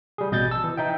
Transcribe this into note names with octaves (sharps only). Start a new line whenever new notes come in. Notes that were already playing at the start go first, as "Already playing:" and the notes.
G3 G#4
A1 B2 D#5 G6 A6
A5 E6
E3
D#4 E5 G5